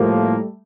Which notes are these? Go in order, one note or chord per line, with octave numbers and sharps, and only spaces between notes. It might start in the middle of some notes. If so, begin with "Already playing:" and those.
Already playing: A2 F3 G3 A3 A#3